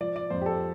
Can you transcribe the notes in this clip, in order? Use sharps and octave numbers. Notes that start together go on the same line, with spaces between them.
F3 D5
D5
F2 C5
G4
A4